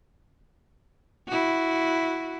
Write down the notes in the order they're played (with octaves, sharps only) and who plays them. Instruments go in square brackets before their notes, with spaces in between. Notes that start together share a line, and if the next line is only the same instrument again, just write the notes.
[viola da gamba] E4 F#4